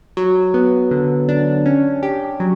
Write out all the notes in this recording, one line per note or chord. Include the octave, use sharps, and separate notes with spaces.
F#3
B3
D3
D4
C#4
G4
F#3